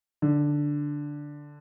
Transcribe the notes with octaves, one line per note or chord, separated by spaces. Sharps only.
D3